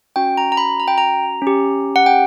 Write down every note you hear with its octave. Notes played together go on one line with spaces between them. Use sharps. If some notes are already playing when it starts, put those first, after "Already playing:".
C#4 F#4 G5
A#5
A#5
B5
A#5
G5
A#5
C#4 G4
F#5
G5